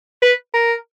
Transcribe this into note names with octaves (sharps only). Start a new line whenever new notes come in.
B4
A#4